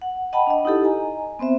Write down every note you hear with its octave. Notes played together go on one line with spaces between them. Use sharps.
F#5
D#5 F#5 G5 A5 B5
D4 D#5
D#4 E4 G4 A4
D#5 G#5 A#5
B3 C4 C5 E5